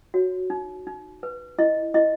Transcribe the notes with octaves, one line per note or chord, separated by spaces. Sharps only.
F#4 C#5
D#4
D#4
B4
E4 D#5
E4 D#5